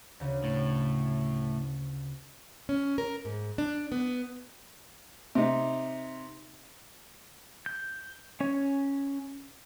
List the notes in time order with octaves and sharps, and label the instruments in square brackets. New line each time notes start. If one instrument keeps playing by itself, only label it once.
[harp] D2 C#3
[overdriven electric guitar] A2
[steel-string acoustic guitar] C#4
A#4
G#2
D4
B3
[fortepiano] C3 D#4
[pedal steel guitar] G6
C#4 C#5